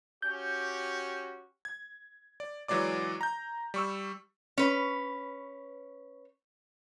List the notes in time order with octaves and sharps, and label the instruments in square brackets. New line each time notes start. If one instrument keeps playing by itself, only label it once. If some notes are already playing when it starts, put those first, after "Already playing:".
[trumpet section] C#4 F#4 G4 [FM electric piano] G6
[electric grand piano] G#6
D5
E3 F#3 G#3 D5 D6
A#5 G6
G3 C#6 E6
[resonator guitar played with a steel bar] C#4 B4